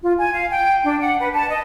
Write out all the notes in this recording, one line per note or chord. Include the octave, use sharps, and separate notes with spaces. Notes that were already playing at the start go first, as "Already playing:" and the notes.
F4
G#5
F5
G5
D4
F#5
B4
A5
D#5